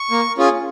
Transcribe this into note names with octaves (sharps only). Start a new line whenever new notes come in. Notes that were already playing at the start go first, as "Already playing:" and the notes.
Already playing: C#6
A#3
C#4 F4 G#4